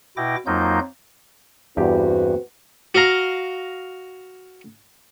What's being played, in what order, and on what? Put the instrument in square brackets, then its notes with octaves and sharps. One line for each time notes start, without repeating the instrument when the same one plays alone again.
[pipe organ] B2 E4 G5 D6 A#6
F2 F#3 A#3 D#4 F4 G6
[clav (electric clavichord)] E2 G2 G4 [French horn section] C4 F#4 B4
[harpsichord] F#4 D#5 F5 A#5